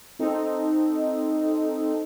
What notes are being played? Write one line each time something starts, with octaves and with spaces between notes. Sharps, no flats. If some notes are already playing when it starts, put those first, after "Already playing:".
C4 D#4 A4